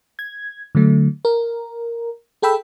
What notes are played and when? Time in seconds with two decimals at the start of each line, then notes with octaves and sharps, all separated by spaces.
0.19 G#6
0.75 D3 F#3 A3
1.25 A#4
2.42 G#4 A4 G5 B5 E6